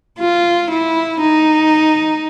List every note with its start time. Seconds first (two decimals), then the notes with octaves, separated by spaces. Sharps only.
0.20 F4
0.71 E4
1.21 D#4